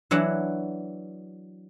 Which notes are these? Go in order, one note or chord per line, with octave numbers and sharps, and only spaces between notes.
E3 F#3 D4 F#5